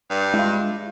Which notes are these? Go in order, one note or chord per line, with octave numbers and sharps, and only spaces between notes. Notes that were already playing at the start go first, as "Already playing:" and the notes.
G2
G#3 E4 F4